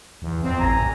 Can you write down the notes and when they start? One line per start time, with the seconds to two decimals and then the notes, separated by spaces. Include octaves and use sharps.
0.22 E2
0.42 F2 C4
0.59 A1 G#5 A#5
0.79 C2